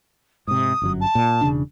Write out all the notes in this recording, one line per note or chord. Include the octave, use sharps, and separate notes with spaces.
G#2 C3 D#6
G1 F#2 F#3
A5
A#2
E1 C#3 D4